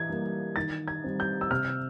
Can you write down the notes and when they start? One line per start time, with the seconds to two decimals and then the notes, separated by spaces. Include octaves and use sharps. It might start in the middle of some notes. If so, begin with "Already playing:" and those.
Already playing: E3 G#6
0.10 G3 A#3
0.56 D#3 A6
0.88 G#6
1.04 G3 C4
1.20 G6
1.41 E6
1.50 C3 F6